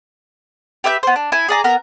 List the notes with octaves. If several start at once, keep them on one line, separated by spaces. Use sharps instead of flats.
G4 B4 E5 G6
B3 C5
D4
E4 G#5
G#4 D5 A#5
B3 A#4 A#5